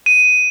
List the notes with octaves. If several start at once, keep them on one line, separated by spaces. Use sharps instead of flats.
D#7